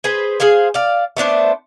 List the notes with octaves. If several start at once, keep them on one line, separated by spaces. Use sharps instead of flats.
G#4 B4 C5
G#4 C5 F5 G#5
D5 F5
A3 B3 D4 C5